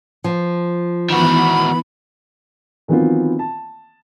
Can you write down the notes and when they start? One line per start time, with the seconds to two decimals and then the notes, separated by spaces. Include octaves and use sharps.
0.24 F3
1.10 D#3 E3 B3 F#4 B5
2.88 D#3 E3 F#3 B3 C4 F4
3.39 A5